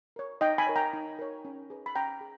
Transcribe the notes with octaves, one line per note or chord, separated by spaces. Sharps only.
A#4 C#5
D#4 D#5 G5
G#5 B5
A#4 C#5
G5 A#5
D#4
A#4 C#5
C#4
G#4 B4
B5
C#4 G5 A#5
G#4